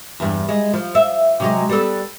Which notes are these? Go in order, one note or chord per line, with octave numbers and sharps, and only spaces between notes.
E2 G2
G#3
F3
E5
C3 F#3 G#3
G3 B3 A4